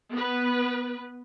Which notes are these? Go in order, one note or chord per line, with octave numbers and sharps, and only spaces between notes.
B3 B4